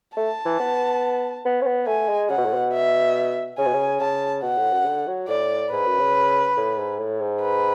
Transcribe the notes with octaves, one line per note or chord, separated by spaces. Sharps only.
A3 A5
E3
B3
B3
C#4
B3
A3 G#5
G#3
C#3 F#5
B2
A2
B2
E5
C#3 G#5
B2
C#3
C#3 A5
B2 F#5
A2
F#2
D3
F#3
A2 D5
G#2 B4
F#2
C#3
A2
G#2
A2
G#2
B4